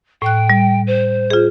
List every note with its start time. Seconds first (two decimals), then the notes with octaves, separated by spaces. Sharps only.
0.22 A2 G5 F#6
0.50 G3
0.86 C5
1.30 F4 G#4